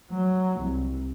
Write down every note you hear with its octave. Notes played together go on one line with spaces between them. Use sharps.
F#3
C2